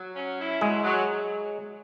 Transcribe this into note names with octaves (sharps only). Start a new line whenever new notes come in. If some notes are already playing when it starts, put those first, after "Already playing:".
Already playing: F#3
C#4
E4
F#3 G#3 G#4
F#3